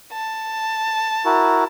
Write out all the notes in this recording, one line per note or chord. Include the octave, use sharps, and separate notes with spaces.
A5
E4 F#4 A#4